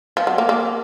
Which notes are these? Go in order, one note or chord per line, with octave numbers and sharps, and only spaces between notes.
F3
F#3
A#3
A#3